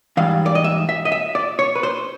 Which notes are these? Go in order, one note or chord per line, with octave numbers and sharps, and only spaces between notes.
G#2 E3 G3 F5
D5
D#5
E5
E5
D#5
E5
D5
C#5
B4
C5